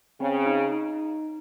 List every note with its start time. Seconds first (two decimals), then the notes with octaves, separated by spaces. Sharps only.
0.20 C#3 C4
0.46 D#4
0.72 D#4